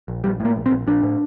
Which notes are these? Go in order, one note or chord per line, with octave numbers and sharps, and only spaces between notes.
A#1
A#1 G3
A2
A#3
A#1
C4
A#1
A#1 D4
A2